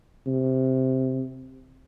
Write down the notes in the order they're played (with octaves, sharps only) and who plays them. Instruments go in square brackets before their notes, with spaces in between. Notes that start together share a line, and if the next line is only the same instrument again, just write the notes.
[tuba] C3